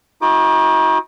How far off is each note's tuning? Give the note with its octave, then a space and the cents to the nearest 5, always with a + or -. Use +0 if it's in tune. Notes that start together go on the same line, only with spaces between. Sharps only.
D#4 +40 F#4 -25 D6 +35